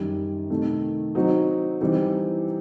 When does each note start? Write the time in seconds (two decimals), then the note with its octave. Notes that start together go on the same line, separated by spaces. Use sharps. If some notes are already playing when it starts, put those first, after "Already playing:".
Already playing: F#2 D#3 G3
0.50 C3 D#3 A3
1.15 F#3 C4 D#4 F#4
1.81 E3 G3 C4 D#4 G4